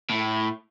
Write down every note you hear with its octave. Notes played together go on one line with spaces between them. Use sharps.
A2